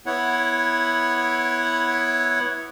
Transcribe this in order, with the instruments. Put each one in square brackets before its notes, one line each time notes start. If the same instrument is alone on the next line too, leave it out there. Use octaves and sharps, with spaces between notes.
[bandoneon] B3 E4 C#5 F#5